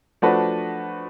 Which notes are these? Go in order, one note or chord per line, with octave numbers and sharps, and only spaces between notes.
F3 A3 D4 F#4 B4